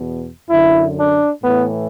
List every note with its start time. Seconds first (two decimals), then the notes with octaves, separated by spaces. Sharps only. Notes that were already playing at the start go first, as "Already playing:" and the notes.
Already playing: E2 B2
0.49 F#2 D3 E4
0.96 D4
1.42 A2 E3 B3